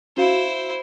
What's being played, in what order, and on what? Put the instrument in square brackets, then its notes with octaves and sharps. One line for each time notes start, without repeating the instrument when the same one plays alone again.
[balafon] C#4 F#4 F5 [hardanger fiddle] E4 C5